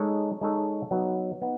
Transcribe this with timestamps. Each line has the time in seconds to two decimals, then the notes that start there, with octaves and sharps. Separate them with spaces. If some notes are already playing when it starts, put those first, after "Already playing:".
Already playing: G#3 D#4 A4 C#5
0.41 G#3 D#4 A4 C#5
0.91 F#3 B3 D#4
1.42 B3 D#4